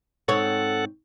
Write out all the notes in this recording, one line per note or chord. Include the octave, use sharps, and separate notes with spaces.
G#2 C4 A4 C#5 F#5